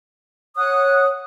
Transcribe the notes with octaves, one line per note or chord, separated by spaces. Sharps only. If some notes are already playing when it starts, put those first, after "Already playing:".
C#5 F#5 D#6 F#6